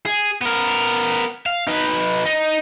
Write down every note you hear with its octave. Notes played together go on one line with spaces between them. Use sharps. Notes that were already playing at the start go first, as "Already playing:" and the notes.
G#4
B3 A#4
F5
D#4 B4
D#4